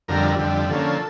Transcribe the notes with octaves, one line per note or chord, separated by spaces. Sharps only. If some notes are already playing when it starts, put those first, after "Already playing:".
F2 D3 G3 A#4
F2 D3 G3
D3 F3 A#3 C#4 A4